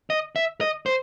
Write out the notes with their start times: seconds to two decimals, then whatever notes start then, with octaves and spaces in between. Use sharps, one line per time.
0.10 D#5
0.36 E5
0.61 D#5
0.86 C5